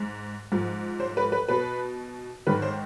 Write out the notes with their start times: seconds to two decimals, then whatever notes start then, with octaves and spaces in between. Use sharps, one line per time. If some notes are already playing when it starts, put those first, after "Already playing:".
Already playing: G#2
0.52 G#2 F3
1.00 C5
1.17 B4
1.32 B4
1.49 B2 B4
2.47 G#2 D#3 B4
2.62 C5